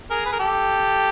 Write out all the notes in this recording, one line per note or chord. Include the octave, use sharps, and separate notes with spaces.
G#4 A#4
B4
A#4
G4 A4